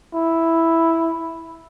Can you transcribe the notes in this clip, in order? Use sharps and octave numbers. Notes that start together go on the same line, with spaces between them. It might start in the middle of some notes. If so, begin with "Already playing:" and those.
E4